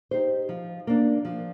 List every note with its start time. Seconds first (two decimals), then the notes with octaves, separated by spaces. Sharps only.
0.11 D#4 G4 C5
0.49 F3
0.87 A#3 D4
1.25 F3